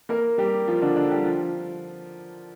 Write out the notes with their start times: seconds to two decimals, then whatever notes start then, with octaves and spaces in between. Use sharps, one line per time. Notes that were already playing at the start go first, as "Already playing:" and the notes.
0.09 A#3 A#4
0.38 G3 G4
0.67 F3 F4
0.82 D3 D4
0.96 D3 D4
1.11 G3 G4
1.24 F3 F4